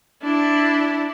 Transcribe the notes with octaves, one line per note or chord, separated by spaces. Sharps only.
D4 E4